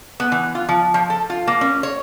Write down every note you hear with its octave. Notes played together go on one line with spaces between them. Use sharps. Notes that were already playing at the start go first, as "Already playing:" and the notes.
B3
E3
F4
F3
F3
A4
F4
A#3
C#4
C#5